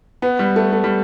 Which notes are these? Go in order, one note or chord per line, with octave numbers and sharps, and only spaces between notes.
B3
G3
A3
A3
G3